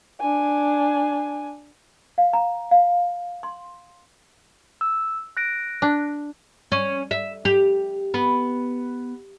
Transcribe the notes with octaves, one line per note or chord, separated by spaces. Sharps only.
D4 G#5
F5
A#5
F5
C6
E6
F#6 A#6 D7
D4
C#4
E5
G4
B3